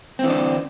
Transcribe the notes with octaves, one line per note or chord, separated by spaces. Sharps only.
D3 E3 C4 D4